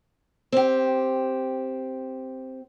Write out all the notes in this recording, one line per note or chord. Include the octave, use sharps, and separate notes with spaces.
C4 G4